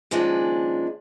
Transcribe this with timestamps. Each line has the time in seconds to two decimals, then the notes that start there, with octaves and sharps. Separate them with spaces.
0.11 D#2 C#3 F3 G#3 D4